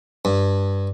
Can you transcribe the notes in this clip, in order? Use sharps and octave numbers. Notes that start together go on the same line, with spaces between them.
G2